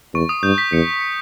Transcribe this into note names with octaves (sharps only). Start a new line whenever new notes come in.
E2 C#6
D#6
G2 G6
B6
E2 C#7
C#7